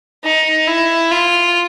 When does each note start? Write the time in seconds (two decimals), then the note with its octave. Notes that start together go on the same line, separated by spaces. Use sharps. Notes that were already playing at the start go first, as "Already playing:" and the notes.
0.24 D#4
0.67 E4
1.11 F4